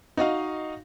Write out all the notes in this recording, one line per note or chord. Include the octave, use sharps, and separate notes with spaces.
D#4 F#4 D#5 F5